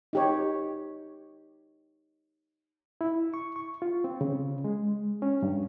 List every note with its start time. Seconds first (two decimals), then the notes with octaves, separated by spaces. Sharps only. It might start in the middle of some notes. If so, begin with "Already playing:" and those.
0.13 D#4 G4 C#5
3.01 E4
3.34 C#6
3.56 C#6
3.82 F4
4.04 C4
4.21 C#3
4.64 G#3
5.22 C#4
5.42 G2